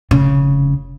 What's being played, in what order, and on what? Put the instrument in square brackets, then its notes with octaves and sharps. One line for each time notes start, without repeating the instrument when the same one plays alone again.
[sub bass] F1 [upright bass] C#3